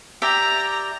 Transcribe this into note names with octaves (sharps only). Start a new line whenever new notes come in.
G4 D5 E5 A#5